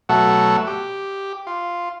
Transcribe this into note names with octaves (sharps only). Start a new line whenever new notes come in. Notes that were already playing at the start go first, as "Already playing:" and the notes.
B2 F#3 A3 A4 F#5
G4
F4